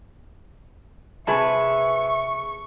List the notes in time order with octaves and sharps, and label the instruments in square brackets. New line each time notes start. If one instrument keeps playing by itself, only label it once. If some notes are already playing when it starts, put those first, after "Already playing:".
[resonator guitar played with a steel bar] C3 G#4 B4 [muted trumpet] E5 [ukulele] A5 B5 [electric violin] C#6